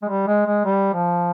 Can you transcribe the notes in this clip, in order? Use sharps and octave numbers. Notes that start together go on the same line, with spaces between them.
G#3
G3
G#3
G#3
G3
F3